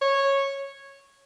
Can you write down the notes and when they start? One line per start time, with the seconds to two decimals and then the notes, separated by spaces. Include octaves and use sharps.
0.01 C#5